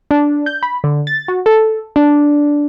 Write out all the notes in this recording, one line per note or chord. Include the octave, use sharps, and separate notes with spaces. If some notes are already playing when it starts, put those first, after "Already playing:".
D4
G6
B5
D3
A6
F#4
A4
D4